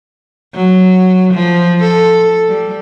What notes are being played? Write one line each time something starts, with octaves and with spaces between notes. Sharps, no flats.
F#3
F3
A4
G3